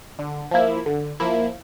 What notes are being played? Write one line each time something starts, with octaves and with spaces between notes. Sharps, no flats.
D3
F3 A#3 E4
D3
F3 A#3 E4